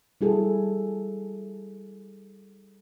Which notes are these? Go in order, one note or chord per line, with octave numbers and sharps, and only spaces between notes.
G3 E4 G#4 A4